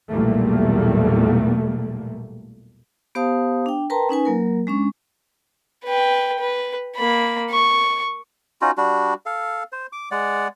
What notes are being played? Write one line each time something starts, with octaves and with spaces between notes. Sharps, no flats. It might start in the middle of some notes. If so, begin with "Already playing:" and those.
B1 E2 A#2 G3 A3 A#3
B3 G4 C5 F5 A5 D#6
D4 G5
A#4 B4 G5 A5 A#5 C6
C#4 D#4 B4 G#5
F#3 A#3 A#4
G#3 C#4 D4 C#6
B4 G5
B4
A#3 B5
C#6
C#4 D#4 F4 F#4
G3 D4 F#4
A4 F5
C5
D6
G#3 D5 F#5